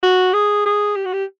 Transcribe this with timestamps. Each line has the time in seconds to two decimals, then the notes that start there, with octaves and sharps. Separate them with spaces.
0.03 F#4
0.33 G#4
0.65 G#4
0.96 G4
1.05 F#4
1.13 G4